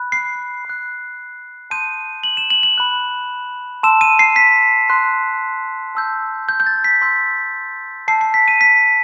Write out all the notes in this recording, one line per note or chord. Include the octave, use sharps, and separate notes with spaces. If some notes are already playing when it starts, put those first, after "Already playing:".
Already playing: B5 F#6
C7
B5 F#6
A5 C6 D#6 G6 D#7
F#7
E7
F#7
F#7
B5 F#6
A5 C6 E6 E7
D#7
C7
B6
C6 F#6
A5 E6 G6
G6
G6
A6
B6
C6 E6 G6
A5 E6 G6 C7
C7
B6
D#7
B6